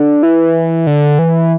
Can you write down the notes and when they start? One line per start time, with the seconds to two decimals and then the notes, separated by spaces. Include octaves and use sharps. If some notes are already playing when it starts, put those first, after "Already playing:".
Already playing: D3
0.23 E3
0.87 D3
1.19 E3